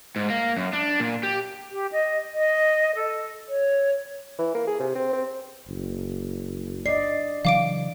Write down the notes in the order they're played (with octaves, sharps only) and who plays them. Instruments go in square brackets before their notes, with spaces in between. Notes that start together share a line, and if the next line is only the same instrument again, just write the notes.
[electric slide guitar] G#2
A#3
F#2
D4
A#2
G4
[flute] G4
D#5
D#5
A4
C#5
[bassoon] E3
A#3
G#4
C3
C4
C4
[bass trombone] F#1
[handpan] D5 D#5 [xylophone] C7
[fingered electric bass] C#3 E3 F#3 [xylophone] F5 D6 D7